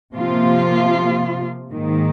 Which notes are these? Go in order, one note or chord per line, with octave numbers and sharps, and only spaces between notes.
C3 F3 A#3 F4
G#2 D#3 A#3